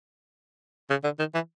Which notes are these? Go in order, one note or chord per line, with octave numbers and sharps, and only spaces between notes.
C#3
D3
D#3
E3